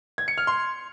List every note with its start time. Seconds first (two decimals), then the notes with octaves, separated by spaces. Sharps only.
0.18 G#6
0.28 C#7
0.38 F6
0.47 C6